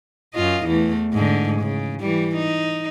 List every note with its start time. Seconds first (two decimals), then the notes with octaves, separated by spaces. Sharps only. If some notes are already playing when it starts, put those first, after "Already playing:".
0.34 F#2 F4 D#5
0.66 E2 E3 A3
1.13 G#2 D3
1.61 C#3
2.00 E3 G3
2.36 D#4